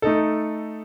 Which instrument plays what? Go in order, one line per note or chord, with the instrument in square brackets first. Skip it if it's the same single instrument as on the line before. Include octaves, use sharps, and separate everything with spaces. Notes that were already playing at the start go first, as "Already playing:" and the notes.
[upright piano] A3 D#4 A4